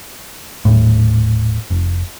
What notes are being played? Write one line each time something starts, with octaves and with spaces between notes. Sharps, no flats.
D#1 A2
F1